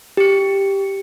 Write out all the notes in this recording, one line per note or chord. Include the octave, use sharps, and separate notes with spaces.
G4 C#7